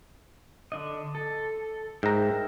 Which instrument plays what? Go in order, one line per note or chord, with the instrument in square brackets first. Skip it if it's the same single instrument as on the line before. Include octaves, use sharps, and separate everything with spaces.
[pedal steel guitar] D3 D4 D#5
A4
[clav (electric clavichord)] G#2 A#5 [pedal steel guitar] A#4 E5 G5